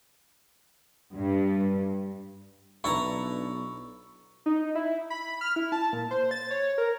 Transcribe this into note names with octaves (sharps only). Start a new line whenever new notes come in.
G2
B1 D4 E4 B4 A5 A#5 C#6
D#4
E4
B5
F6
E4
A5
A#2
C5
A6
C#5
A#4